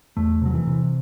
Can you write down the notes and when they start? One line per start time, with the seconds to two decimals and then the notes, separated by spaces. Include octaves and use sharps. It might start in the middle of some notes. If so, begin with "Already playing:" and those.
0.17 E2 A3
0.42 C3 F#3
0.54 E3
0.67 C3